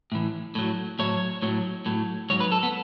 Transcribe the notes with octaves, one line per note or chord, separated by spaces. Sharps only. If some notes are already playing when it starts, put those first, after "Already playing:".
A2 E3
A2 F#3
A2 F#3 C#5
A2 F#3
A2 F#3
G#2 F#3 C#5
B4
A4
B3